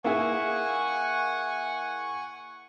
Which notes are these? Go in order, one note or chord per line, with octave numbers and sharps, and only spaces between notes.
A#3 E4 G#4 F#5 G#5 C#6